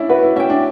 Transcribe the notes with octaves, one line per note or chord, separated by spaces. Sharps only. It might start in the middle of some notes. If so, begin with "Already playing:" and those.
Already playing: C#4 D4 E4
F#4 B4
E4
C#4 E5 G5
D4